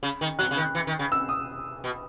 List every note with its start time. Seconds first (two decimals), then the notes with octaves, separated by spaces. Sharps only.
0.03 C#3
0.21 D#3
0.39 F#3 F#6
0.51 C#3
0.57 D#3
0.75 E3
0.87 D#3
0.99 C#3
1.12 E6
1.29 D#6
1.84 B2